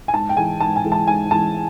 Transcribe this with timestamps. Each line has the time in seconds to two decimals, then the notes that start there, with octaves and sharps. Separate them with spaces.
0.08 G#5
0.13 G#2 A5
0.29 G5
0.37 E3 G#3 G#5
0.60 G#2 A5
0.76 G#5
0.84 E3 G#3
0.92 A5
1.07 G#2 G#5
1.31 E3 G#3 A5